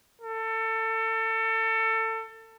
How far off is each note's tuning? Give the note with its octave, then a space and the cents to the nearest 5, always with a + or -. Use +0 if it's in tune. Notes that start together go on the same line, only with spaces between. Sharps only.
A4 +25